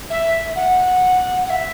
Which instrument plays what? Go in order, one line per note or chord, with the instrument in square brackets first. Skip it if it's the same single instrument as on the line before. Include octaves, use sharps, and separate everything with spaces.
[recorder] E5
F#5
F#5
E5